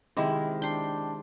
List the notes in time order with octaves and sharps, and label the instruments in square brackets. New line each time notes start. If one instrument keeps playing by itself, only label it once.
[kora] C3 G#3 E4 [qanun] D#3
[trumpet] D4 [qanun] G5 C6